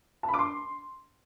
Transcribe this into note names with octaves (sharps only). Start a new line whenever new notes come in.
A5
B5
D6
C6